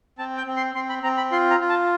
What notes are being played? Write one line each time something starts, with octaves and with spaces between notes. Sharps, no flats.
C4 A5
G5
C4
C6
C4 C6
B5
C4 A#5
B5
F4 C6
A#5
F4
A5